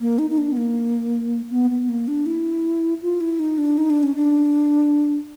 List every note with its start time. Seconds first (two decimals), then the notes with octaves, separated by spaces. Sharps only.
0.01 A#3
0.19 D#4
0.30 D#4
0.38 D4
0.52 B3
0.57 A#3
1.51 B3
1.70 B3
1.89 A#3
2.08 D4
2.26 E4
3.02 F4
3.21 E4
3.39 D#4
3.58 D4
3.78 D#4
3.90 D4
4.03 C#4
4.16 D4